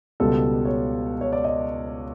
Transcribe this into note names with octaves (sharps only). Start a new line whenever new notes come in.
C#2 B2 G3 B3 A4
C#5
C#5
D5
D#5